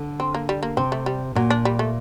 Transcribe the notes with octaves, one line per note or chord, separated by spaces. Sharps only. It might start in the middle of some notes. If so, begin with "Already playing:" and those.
Already playing: D3
C4
A#3
G3
A#3
C3 C4
A3
G3
A#2 F#3
D4
G3
A3